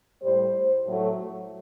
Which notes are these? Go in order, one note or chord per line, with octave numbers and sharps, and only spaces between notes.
A2 G3 C5
A2 F#3 A3